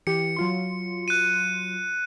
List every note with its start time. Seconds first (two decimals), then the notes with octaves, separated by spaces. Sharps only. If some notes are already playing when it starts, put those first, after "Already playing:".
0.07 E3 G4 C#7
0.36 F#3 F4 C6
1.08 F#6 D#7